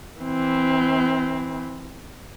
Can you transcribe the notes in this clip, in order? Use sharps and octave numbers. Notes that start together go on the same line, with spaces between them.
E3 C4